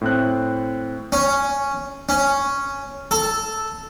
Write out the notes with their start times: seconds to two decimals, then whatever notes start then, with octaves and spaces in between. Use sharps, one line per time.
0.01 A2 C4 F#6
1.12 C#4
2.09 C#4
3.11 A4